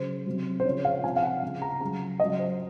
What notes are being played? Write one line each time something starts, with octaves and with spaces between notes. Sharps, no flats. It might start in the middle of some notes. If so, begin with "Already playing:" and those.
Already playing: C#3 F#3 C5
C3 F#3
C5
C#3 F3 C#5
F5
C3 F3 G#5
F5
F#5
C#3 F3
A#5
C#3 F#3 A#5
C#3 F#3 D#5
C5